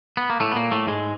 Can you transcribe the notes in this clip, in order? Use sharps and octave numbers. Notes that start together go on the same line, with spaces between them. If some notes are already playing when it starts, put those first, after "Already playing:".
B3
A#3
A2 A3
B3
A#2 A#3
A2 A3
G#2 G#3